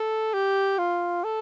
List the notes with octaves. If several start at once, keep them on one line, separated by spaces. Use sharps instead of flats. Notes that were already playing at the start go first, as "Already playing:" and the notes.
Already playing: A4
G4
F4
A4